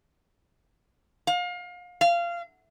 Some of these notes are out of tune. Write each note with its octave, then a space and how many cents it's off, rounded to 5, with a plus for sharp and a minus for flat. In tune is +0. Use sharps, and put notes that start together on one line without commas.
F5 +30
F5 -20